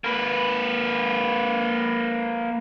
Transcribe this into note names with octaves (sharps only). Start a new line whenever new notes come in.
A#3 B4